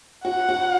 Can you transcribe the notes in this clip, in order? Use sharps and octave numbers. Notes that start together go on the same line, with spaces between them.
F#4 F#5
F#4